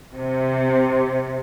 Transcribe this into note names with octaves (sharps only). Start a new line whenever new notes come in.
C3